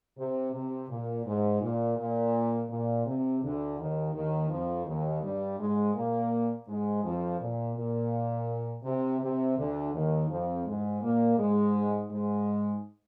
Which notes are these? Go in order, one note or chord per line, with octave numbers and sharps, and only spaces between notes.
C3
C3
A#2
G#2
A#2
A#2
A#2
C3
D2 D3
D#2 D#3
D#2 D#3
F2 F3
D#2 D#3
G2 G3
G#2 G#3
A#2 A#3
G#2 G#3
F2 F3
A#2
A#2
C3
C3
D2 D3
D#2 D#3
F2 F3
G#2 G#3
A#2 A#3
G#2 G#3
G#2 G#3